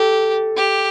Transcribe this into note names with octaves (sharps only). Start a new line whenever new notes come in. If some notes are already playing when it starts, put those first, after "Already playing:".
Already playing: G4 A4
G4